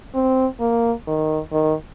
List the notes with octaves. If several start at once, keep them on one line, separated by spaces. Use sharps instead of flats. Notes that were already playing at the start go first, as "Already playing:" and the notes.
C4
A#3
D#3
D#3